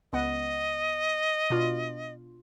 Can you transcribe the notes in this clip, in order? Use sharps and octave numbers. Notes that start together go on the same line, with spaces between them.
C#2 B3 D#5 F#5
B2 D4 F4